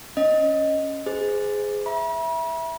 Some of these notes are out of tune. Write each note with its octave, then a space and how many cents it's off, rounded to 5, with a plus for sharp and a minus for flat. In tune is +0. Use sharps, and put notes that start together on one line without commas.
C#4 +0 D#5 +0
G#4 +0 C5 -35
E5 +0 B5 -45